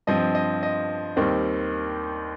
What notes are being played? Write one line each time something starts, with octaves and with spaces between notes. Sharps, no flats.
G2 F3 C4 D#5
D#5
D#5
D#2 D#3 G3 C4 C5